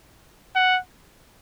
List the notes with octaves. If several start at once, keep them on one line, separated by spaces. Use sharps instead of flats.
F#5